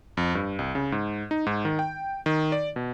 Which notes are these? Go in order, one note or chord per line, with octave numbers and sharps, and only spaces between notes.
F2
G2
C2
C#3
G#2
D#4
G#2
D#3
G5
D#3
D5
B2